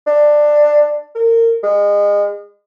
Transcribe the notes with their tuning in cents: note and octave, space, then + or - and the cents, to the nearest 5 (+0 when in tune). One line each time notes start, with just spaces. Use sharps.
D4 +15
A#4 -25
G#3 -30